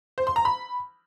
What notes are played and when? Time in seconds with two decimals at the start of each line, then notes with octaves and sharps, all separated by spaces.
0.18 C5
0.27 C6
0.36 A#5
0.45 B5